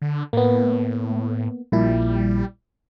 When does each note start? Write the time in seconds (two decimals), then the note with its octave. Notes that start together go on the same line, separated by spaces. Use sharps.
0.02 D3
0.33 A2 A#3 B3
1.72 A#1 A#2 G3 E4